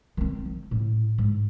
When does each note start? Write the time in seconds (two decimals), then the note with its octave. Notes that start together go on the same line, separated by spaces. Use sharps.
0.17 D#3 C4
0.45 F3
0.71 A2
1.18 G#2